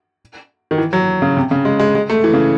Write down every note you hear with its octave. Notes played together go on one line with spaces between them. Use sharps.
D#3
E3
F#3
C#3
C3
C#3
G#3
G#3
G#3
A3
E3
C#3